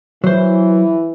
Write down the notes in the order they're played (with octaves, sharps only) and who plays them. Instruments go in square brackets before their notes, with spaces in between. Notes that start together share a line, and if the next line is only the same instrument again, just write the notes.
[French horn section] E3 [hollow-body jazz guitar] F#3 C5